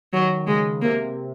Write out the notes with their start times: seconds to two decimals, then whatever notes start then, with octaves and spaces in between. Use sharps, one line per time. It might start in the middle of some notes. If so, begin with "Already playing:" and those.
0.13 D#3 F#3
0.47 C#3 G#3
0.82 C3 A#3